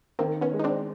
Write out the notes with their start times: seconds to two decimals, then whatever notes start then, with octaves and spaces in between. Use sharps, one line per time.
0.19 D#3 A#3 C4
0.41 B3 C#4
0.53 G#3
0.59 D#4
0.64 C4 D4